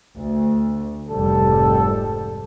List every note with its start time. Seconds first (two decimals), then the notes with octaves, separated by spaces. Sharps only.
0.16 D2
1.09 F1 G#2 G3 A4